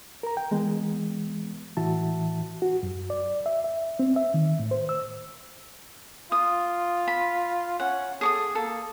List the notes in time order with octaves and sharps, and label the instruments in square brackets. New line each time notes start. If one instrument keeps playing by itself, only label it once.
[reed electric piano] A#4 A#5
G5
E3 G#3 B3
A2 E3 F#4 E5 A5
F#4
F#2
D5
E5
E5
C4
E5
D#3
A2
C5
E6
[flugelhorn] F4 [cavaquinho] D#6
[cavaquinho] B5
[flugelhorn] C#4 [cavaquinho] F#5
[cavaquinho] G#4 C#6 D#6 [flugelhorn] A4
[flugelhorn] A#3 [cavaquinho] A4